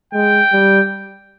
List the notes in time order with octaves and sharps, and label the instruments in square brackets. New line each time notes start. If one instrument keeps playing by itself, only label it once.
[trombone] G#3 [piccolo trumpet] G5
[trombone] G3